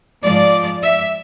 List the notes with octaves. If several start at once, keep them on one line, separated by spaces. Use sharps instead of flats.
G#2 F3 G#3 D5
E5